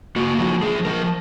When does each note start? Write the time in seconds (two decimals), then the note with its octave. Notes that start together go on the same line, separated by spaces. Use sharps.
0.16 A#3 F#4
0.38 F3 F#4
0.62 F3 G#4
0.85 F3 A#4